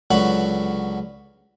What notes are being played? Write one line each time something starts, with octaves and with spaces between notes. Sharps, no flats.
C#2 D3 F#3 B4 A5 B5